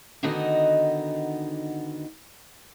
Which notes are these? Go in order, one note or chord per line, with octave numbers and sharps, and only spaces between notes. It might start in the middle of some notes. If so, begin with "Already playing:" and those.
D3 D#3 B3 D#4 F#4 D#5